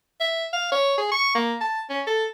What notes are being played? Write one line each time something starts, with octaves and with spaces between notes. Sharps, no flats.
E5
F5
C#5
G#4
C#6
A#3
A5
C#4
A4